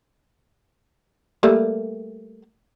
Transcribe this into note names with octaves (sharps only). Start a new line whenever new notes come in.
G3 A3 A#3